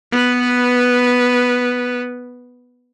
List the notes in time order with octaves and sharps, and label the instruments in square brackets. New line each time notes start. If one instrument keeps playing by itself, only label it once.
[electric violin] B3 B4